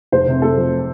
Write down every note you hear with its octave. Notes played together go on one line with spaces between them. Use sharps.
F1 C5
C3
A3 A4
F2